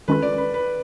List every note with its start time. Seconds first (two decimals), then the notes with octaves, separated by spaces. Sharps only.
0.08 D#3 G#3 C#4 F4 A4 B4
0.22 D5
0.38 B4
0.54 B4